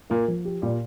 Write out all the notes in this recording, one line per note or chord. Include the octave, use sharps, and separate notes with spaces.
A#2 A#3 F4
F3
G4
A#2 G3